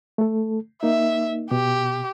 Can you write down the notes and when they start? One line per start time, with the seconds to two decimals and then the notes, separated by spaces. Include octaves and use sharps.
0.18 A3 A4
0.83 A#3 D#4 E5
1.51 B2 G4